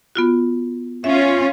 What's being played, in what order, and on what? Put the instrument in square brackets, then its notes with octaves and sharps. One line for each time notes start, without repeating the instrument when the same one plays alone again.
[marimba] B3 F4 F#4
[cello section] C#4 F4 [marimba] E5